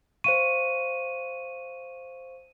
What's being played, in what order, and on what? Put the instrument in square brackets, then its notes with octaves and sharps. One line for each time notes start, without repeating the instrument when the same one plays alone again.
[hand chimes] C5 F5 C#6 [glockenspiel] D#7